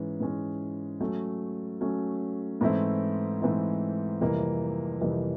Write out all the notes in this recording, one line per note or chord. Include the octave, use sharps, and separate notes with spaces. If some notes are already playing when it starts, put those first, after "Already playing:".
Already playing: G#2 E3 G#3 C#4
G#2 E3 G#3 C#4
F#3 A3 C#4
F#3 A3 C#4
G#2 E3 A3 C4 E4
G#2 E3 A3 C4 E4
F2 C3 E3 G3 A#3
F2 C3 E3 G3 A#3